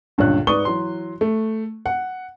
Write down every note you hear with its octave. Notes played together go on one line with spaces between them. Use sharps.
C#2 G2 A#2 D3 C#5 F#6
G#2 B4 D5 C#6 D#6 G7
E3 F#3 C6
A3
F#5